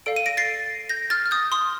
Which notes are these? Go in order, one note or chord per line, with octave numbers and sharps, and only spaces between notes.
A4 D5 F5 D7
D#7
A#6 D7
A6 C7
G6 A#6
F6 A6
F6
D#6 G6
C6 D#6